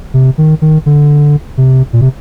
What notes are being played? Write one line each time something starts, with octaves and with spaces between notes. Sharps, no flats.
C3
D#3
D#3
D3
C3
A#2
C3